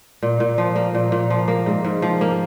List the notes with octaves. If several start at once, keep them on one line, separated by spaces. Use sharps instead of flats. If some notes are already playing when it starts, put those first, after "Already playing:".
A#2
A#2
F3
A#3
A#2
A#2
F3
A#3
G#2
G#2
F3
A#3